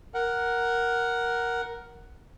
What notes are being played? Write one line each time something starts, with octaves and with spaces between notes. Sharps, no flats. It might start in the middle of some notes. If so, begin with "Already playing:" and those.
A#4 F#5